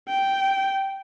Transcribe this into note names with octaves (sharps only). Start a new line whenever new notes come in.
G5